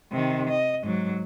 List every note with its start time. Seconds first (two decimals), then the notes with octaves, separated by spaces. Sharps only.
0.12 C3 D#3
0.50 D#5
0.83 G#2 F#3